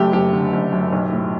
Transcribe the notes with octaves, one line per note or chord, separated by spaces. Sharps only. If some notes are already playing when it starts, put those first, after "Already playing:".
Already playing: F#1 F#2 A3 G4
F#1 G4
D3
F#1
F#2
B1
A2